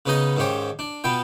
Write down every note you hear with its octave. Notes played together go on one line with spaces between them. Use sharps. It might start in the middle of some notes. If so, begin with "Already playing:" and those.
C#3 B3 C#4 D#4 D#5
D#2 G#2 C#4 G4 C5
D4
B2 B3 F4 G5